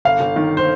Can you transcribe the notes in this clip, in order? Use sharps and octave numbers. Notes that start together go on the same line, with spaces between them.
G1 F5
G1
D#3
C5